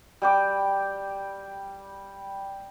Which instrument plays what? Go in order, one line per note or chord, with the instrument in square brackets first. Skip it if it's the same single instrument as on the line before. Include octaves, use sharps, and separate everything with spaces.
[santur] G3 G5 D6